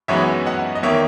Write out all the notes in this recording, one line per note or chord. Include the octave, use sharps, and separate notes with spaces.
F#2 E3 G#3 B3 D#4 C#5 E5
D#5 F#5
D#5
E2 D#3 A#3 C#5 E5